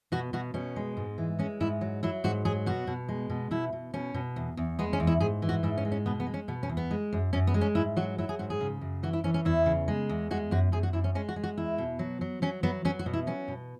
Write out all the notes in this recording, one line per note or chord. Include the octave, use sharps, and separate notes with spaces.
B2 F#4
B2 F#4
B2 C#4
G#3
G#2
E3
G#3 C#4
G#2 E4
F#3
F#3 E4
G#2 F#4
F#3 G#4
B2 F#4
B2
G#3
B2
B2 E4
B2
B2 C#4
B2
E2
E2
G#3 B3
C#4
E2
E4
G#2 G#4
E3
F#4
G#2 E4
C#4
G#3
C#4
B2 B3
B3
G#3
C#4
B2 B3
C#4
E2
B3
G#3
F#2
F#2 C#4
B3
G#3
C#4
G#2 E4
F#3 F#4
F#3 E4
G#4
G#2 F#4
G#4
C#3
F#2
E3 F#4
E4
E3 C#4
C#4
E2 E4
C#3
G#3
E2
G#3 F#4
F#2 F#4
F#2 G#4
F#4
F#2 E4
C#4
G#3 C#4
F#4
G#3
F#4
E2 E4
B2
F#3
F#3
F#3 C#4
F#3 B3
F#3 C#4
F#4
B2
E4
F#3 C#4
B2